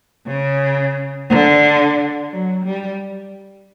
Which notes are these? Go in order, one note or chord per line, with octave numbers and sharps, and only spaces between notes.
C#3
D3
F#3
G3